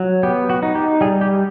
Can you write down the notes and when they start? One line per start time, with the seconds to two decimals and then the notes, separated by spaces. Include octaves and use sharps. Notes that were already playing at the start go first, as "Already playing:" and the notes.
Already playing: F#3
0.23 B3 G4
0.50 F#4
0.63 D#4
0.75 G4
1.01 G3 G#4
1.21 G4